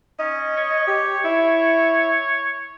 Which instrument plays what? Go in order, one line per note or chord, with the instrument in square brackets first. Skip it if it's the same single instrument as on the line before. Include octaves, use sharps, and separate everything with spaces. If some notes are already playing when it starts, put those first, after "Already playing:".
[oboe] C#4 [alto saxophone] D#5
[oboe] C#5
[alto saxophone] G4
E4